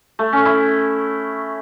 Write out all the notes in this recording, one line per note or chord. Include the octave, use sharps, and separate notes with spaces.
A3
C#4
E4